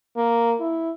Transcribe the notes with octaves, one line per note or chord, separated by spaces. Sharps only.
A#3
E4